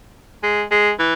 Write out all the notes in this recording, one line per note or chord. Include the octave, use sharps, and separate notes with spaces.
G#3
G#3
E3